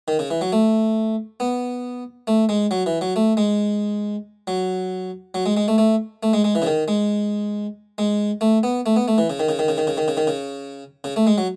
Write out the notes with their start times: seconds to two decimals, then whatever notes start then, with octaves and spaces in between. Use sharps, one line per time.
0.08 D#3
0.19 C#3
0.31 E3
0.41 F#3
0.52 A3
1.40 B3
2.27 A3
2.49 G#3
2.71 F#3
2.86 E3
3.01 F#3
3.16 A3
3.37 G#3
4.47 F#3
5.34 F#3
5.46 G#3
5.57 G#3
5.68 A3
5.78 A3
6.23 A3
6.33 G#3
6.44 G#3
6.55 E3
6.62 C#3
6.66 D#3
6.88 G#3
7.98 G#3
8.41 A3
8.63 B3
8.86 A3
8.96 B3
9.08 A3
9.18 E3
9.30 C#3
9.40 D#3
9.49 C#3
9.59 D#3
9.68 C#3
9.78 D#3
9.87 C#3
9.97 D#3
10.08 C#3
10.17 D#3
10.27 C#3
11.04 C#3
11.16 A3
11.27 G#3
11.38 F#3